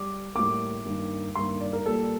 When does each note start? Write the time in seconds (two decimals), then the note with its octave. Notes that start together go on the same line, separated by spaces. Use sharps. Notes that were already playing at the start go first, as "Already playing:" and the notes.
Already playing: G3 D6
0.35 A2 G3 A#3 D6
0.85 G2 D#3 A#3
1.35 G2 D#3 A#3 C6
1.60 D5
1.73 A#4
1.86 A#2 G3 A#3 A4